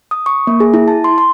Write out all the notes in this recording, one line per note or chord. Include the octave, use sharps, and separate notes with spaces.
D#6
C#6
A#3
G#4
E4
A5
C6
C6